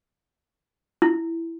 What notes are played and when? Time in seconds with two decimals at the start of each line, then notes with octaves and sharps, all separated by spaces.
1.02 E4